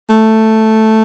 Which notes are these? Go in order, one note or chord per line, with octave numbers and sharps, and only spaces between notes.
A3